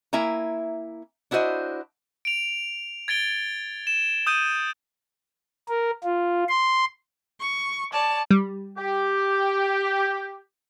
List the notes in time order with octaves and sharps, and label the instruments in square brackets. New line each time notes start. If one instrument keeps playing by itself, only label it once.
[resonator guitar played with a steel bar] A#3 E4 E5 G#5 A#5
D4 E4 F#4 C5 D#5
[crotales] D7 F7
G#6 A6 D7 G7
E7
D#6 G6 D#7
[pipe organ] A#4
F4
C6
[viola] C#6
[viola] C#5 D5 [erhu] A5
[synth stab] G3
[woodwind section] G4